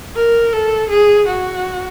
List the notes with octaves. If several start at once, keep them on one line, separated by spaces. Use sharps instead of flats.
A#4
A4
G#4
F#4